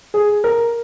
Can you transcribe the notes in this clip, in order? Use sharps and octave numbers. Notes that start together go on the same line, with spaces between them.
G#4
A#4